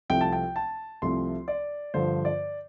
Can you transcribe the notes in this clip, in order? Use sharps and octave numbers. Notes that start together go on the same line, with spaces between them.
C2 C3 F3 A3 G5
A5
G5
A5
C2 C3 F3 A3 C6
D5
G2 D3 F3 C5
D5